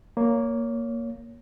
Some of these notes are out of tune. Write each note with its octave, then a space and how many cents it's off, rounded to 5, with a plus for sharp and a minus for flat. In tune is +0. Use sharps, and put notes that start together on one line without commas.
A#3 +0 C#5 +15